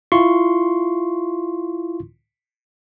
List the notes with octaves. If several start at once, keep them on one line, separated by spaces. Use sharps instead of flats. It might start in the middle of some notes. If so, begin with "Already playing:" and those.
E4 F4 C6 C#6